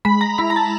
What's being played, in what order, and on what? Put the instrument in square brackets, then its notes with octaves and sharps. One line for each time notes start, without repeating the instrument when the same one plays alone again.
[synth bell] G#3 B5
A#5
E4 B5
A#5
A5